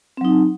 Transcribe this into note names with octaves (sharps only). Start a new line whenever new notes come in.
F#3 C4 D#4